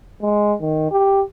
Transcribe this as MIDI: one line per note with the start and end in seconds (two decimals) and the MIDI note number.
0.22 0.53 56
0.61 0.91 51
0.91 1.21 67